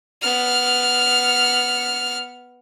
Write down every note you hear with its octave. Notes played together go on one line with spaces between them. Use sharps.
B3 F6